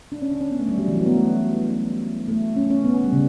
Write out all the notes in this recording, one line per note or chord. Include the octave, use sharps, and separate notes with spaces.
D4
C#4
D4
C#4
B3
A3
G3
F#3
E3
F#3
B3
A3
A3
C#4
C#4
B3
C#4
G3
C#3